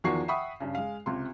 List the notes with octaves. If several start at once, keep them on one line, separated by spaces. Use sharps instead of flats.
E2 D#3 F3 F#4 C#6 C7
E5 F#5 G5 B5 C#6 D#6
G2 C#3
G#3 F5
C#2 C3 C6